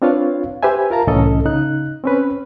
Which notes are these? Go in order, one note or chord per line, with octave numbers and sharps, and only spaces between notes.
C4 D4 F4 B4 C#5 F5
G4 B4 C5 E5 G#5
F4 A#4 F5 A5 A#5
C2 A2 E3 C#4 A4 D#5
C#3 D#4 F#6
C4 C#4 B4